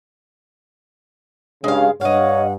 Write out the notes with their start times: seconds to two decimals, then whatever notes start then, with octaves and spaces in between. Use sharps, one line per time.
1.64 G2 C#3 G#3 F5
2.01 G2 C#5 D#5 F5 F#5